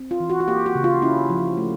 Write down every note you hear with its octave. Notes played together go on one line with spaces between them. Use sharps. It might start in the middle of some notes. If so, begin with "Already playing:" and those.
Already playing: C4
F4
E3
F#4
F#4
A#3 G4
F#4
C#3
F4
C#4 E4
F3
A3